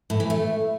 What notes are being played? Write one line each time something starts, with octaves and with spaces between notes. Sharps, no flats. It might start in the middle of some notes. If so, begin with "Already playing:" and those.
A2
E3
A3